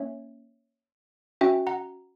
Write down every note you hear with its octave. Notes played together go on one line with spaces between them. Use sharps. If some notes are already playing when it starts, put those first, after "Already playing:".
Already playing: A#3 C#4 C#5 E5
C#4 F#4 E5 G5
F#5 A#5